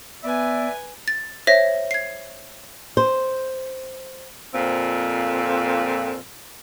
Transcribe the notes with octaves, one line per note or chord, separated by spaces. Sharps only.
B3 B4 D5 E5 G#5
A6
C5 C#5 E5 A#6 B6
G#6 C7
C5
F2 A#2 C4